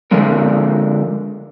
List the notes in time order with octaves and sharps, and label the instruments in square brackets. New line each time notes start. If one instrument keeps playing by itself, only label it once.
[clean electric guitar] D3 F3 G#3 A#4